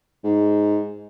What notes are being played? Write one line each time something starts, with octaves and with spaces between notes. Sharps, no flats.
G#2